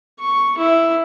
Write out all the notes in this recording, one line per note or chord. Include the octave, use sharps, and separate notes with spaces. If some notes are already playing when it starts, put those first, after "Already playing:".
C#6
E4